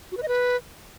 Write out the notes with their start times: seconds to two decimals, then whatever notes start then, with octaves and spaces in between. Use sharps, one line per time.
0.12 F#4
0.17 B4
0.23 D#5
0.28 B4